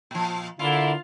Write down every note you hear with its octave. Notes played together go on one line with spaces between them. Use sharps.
A#2 F3
D3 A#3 D4 E4 F4